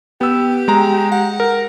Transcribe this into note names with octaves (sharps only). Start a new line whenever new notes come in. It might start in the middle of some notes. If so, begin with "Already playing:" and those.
B3 G4 E6
G#3 A#5
F#5
A#4